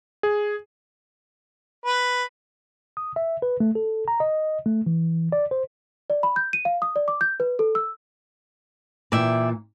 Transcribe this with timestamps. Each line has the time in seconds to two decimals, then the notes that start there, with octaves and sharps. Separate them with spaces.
0.23 G#4
1.86 B4
2.97 D#6
3.16 E5
3.42 B4
3.60 A3
3.75 A4
4.08 A#5
4.20 D#5
4.66 A3
4.86 E3
5.32 D5
5.51 C5
6.10 D5
6.23 B5
6.36 G6
6.53 D#7
6.65 F5
6.82 D#6
6.96 D5
7.08 D6
7.21 G6
7.40 B4
7.59 A4
7.75 E6
9.12 A#2 E3 D5 E5 G5